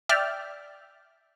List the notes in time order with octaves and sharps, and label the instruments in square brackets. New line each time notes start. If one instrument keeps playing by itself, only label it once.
[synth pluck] D5 E5 G5 F6